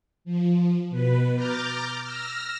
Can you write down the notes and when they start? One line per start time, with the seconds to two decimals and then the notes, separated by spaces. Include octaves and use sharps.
0.25 F3
0.90 B2 B4
1.35 A#5 D6 F6 G6 A6
2.03 E6 F6 A#6